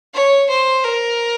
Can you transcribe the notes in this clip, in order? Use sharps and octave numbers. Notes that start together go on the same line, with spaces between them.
C#5
C5
A#4